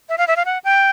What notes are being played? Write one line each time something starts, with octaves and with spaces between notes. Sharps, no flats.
E5
F5
E5
F5
F#5
G5